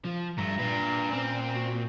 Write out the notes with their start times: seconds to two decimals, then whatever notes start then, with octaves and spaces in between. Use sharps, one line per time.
0.05 F3
0.38 G2 E3 A3 A#5
0.59 A#2 D4 B4
1.12 C4 C#4
1.55 F#4